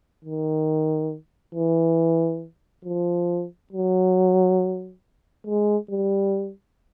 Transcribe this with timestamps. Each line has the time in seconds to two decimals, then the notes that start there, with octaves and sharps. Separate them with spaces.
0.24 D#3
1.55 E3
2.84 F3
3.72 F#3
5.47 G#3
5.90 G3